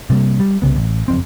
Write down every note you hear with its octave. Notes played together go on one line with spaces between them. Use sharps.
C3 G3 A#3
G3
C2 C#3 B3
A1
F#1 F2 C4